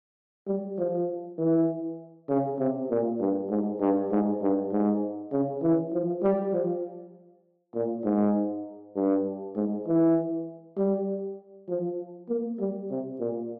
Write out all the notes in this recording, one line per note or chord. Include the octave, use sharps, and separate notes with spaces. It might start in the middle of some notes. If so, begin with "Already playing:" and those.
G3
F3
E3
C#3
C3
A#2
G2
G#2
G2
G#2
G2
G#2
C#3
E3
F3
G3
F3
A#2
G#2
G2
G#2
E3
G3
F3
A#3
G3
C3
A#2